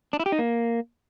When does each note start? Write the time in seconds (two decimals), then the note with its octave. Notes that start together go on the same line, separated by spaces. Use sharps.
0.13 D4
0.20 E4
0.26 G4
0.32 D#4
0.39 A#3